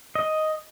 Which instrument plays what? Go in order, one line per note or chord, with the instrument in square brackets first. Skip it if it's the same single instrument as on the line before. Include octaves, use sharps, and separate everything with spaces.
[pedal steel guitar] D#5